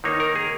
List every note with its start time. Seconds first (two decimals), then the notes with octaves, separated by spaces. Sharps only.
0.04 D#3 A#3 D#4 C#5
0.20 A#4
0.36 G#4